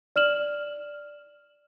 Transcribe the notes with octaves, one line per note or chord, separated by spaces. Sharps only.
D5 F6 E7 F#7